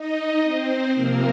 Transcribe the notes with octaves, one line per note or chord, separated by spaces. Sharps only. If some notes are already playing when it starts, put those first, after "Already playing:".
Already playing: D#4 D#5
C4 C5
C3 F3 A#3 A#4